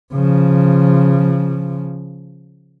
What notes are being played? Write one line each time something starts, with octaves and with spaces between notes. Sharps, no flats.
C#3 F3